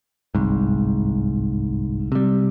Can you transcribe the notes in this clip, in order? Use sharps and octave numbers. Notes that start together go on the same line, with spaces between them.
G1 C2 G#2
C3 G3